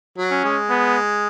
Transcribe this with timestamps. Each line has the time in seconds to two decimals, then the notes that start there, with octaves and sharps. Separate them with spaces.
0.18 F#3
0.31 C#4
0.44 G#3
0.70 B3